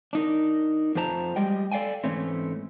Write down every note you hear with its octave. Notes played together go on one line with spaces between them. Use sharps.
D4 D#4 A#4
F2 F3 A3 C5 A5 A#5
G3 G#3 G4 D#5 G5
A4 D5 F5 G5 G#5
G#2 E3 A3 C4 C#4 E4